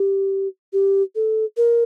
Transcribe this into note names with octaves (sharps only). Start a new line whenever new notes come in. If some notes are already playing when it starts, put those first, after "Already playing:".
Already playing: G4
G4
A4
A#4